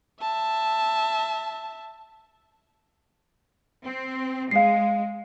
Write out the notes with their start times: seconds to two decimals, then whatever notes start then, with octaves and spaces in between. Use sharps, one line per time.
0.21 E5 A5
3.85 C4
4.51 G#3 F5 C7